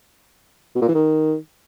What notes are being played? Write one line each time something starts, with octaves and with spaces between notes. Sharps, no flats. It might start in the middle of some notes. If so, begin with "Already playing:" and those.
B2
A#2
E3
D#3